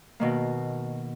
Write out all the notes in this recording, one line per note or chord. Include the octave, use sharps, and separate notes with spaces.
B2 D#3 A#3